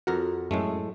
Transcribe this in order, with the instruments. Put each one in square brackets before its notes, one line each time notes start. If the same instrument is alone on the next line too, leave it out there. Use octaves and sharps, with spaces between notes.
[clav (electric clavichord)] F2 A#4 F#5 [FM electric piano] F#4
[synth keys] F#2 [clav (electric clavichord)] A2 G#3 A3